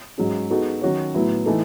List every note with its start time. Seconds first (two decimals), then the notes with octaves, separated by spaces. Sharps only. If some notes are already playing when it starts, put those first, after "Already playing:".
0.18 G#2 F#3 C#4 G#4
0.50 G#3 B3 D#4 F#4 A4
0.81 D#3 F#3 C#4 F#4 C#5
1.14 A2 F#3 B3 E4
1.46 E3 A3 D#4 A4